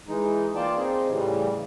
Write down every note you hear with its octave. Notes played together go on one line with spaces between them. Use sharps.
E3 G#3 D#4
A#3 F4 D5 G5 A5
C4 D#4 G#4
A2 C#3 E3 G3